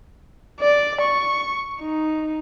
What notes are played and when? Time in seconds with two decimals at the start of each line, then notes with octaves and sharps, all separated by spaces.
0.60 D5
1.02 C#6
1.81 D#4